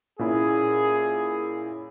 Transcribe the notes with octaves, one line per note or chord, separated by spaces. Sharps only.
A#2 C#4 E4 G#4